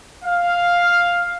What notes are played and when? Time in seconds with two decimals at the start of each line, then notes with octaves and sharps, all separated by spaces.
0.25 F5